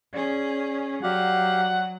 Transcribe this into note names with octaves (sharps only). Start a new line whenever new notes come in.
C#4 G#4 D5 G#6
F#3 F#4 G4 D5 F5 F#5